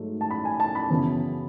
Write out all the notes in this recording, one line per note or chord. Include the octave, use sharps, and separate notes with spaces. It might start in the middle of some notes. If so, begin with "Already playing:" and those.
Already playing: G#2 F#3 A3
A5
B5
G#5
A5
B5
F#2 C#3 E3 B3